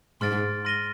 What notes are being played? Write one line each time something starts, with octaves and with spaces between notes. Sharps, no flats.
G#2 C6 F6 A6 D7
C6 F6 A#6 D#7 G7